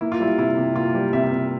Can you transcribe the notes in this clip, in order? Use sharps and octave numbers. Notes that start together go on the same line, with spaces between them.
A#3 E4
F4
G3 E4
C3 E4
C3
A#3 F4
G3
C3 E5
C3